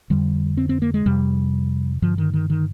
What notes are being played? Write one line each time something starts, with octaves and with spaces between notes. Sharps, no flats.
F2 D3 G3
C4
C4
A#3
G#3
F2 C3 G3
G2 D3 F3
D#3
D#3
D#3